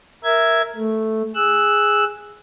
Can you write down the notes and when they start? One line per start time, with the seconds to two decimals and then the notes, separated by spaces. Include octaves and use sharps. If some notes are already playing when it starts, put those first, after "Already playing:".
0.24 A#4 E5 G#6
0.76 A3
1.35 G#4 E6 F#6